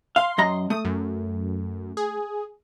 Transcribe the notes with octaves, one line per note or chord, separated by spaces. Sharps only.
F5 C6
F#2 D#5 A#5
A3 D#6
F#2
G#4